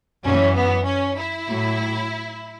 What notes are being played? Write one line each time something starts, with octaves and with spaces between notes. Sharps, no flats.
F#2 E3 C#4
B3
C#4
E4
A2 F#3